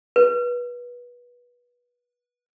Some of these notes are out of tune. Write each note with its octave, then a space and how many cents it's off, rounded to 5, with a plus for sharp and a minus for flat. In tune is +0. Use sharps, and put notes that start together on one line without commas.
B4 -25